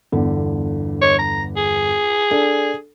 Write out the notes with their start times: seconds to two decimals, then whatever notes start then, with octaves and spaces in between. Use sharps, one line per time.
0.12 G1 E2 D3
1.02 C#5
1.19 A#5
1.57 G#4
2.31 D4 A4